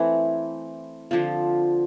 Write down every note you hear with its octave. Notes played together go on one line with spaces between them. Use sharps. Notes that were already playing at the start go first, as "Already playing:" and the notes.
Already playing: E3 A3 C4
D3 F3 C4 F4